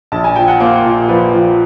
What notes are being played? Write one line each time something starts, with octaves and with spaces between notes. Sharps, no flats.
A#1 A5
G#5
F3 G5
F#5
A#3 C5
A#2
F3 B4
F3